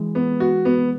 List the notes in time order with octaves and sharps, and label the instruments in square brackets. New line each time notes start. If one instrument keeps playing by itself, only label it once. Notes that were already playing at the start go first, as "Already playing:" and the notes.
Already playing: [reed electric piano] E3 G#3
[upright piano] B3
F#4
B3